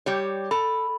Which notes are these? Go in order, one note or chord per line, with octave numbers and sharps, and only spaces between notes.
G3 G4 C#5
A4 B5